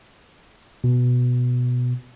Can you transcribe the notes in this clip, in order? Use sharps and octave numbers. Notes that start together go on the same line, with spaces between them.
B2